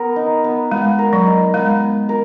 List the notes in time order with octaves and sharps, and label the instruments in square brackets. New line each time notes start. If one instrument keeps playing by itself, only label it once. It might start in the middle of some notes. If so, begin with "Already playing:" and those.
Already playing: [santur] B3 A#4
D#4
B3
[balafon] G#3 [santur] B3
[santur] A#4
[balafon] F#3
[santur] D#4
[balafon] G#3 [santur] B3
[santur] B3
A#4